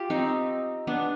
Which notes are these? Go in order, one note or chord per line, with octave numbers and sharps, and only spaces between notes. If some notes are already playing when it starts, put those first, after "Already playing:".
Already playing: F4 G4
C4 D#4
B3 D4